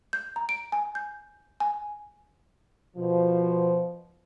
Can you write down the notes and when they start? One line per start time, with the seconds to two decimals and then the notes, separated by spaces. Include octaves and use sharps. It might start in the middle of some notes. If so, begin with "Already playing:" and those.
0.13 G6
0.36 A#5
0.49 D7
0.72 G#5
0.95 G6
1.60 G#5
2.97 B2 F3